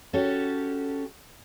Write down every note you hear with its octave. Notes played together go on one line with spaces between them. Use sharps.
C#4 F#4 G4 A4